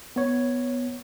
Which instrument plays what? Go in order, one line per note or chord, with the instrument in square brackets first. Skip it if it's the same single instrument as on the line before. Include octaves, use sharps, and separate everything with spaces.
[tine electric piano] B3 C#5